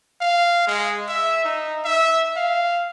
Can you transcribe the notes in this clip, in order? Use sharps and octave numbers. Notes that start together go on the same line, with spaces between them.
F5
G#3
E5
D#4
E5
F5